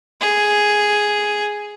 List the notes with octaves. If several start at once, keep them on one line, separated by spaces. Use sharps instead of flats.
G#4